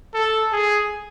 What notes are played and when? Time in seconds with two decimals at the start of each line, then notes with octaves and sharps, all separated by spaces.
0.14 A4
0.53 G#4